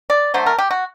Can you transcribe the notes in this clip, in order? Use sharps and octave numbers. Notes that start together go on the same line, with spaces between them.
D5
D3 F#3 A3 C5
A#4
G4
F#4